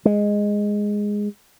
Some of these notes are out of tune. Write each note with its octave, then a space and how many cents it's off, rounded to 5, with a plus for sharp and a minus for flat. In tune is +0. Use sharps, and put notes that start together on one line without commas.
G#3 -5